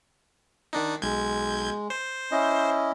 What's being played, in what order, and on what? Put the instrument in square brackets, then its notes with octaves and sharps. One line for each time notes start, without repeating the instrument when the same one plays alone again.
[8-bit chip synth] D#3 D4 D#4
[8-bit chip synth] B1 G6 G#6 [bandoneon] G#3
[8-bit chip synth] C5
[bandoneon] C#4 E4 D#5